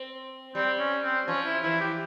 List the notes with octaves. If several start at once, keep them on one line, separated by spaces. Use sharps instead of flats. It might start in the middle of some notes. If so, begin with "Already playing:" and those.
Already playing: C4
G3 C4
C#4
C4
F3 C#4
E4
E3 E4
G4